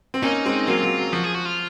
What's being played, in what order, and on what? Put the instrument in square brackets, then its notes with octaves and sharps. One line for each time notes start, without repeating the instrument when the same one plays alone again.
[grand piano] C4
[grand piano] A#3 C#4 [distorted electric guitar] D#4
[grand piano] G#3 C4
[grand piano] F#3 A#3 [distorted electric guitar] F4
[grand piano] F#3
F#3
[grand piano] F3 [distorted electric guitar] F#4
[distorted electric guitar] G#4
F#4
F4